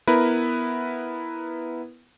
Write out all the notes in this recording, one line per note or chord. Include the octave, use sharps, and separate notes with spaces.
B3 E4 A#4 B4